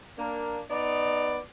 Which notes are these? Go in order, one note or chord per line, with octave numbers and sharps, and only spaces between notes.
A#3 D4
B3 D#4 D5